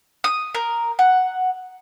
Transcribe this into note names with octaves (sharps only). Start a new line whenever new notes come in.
D#6
A#4
F#5